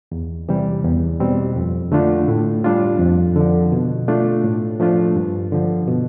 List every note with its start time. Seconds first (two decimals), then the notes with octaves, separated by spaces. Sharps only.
0.12 E2
0.49 C3 E3 G3
0.85 E2
1.20 B2 G3 C4
1.56 F2
1.92 D3 A3 D4 F4
2.28 A2
2.64 G3 D4 F4
2.99 F2
3.36 D3 F3
3.72 B2
4.08 A3 D4 F4
4.44 A2
4.79 F3 A3 D4 F4
5.16 G2
5.52 D3 F3
5.88 B2